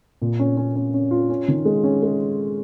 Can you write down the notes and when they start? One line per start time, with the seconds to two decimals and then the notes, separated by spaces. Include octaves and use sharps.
0.22 A#2
0.40 C#4
0.57 C#4
0.76 C#4
0.94 C#4
1.11 F4
1.29 C#4
1.48 D#3
1.65 G#3
1.84 C#4
2.03 G#3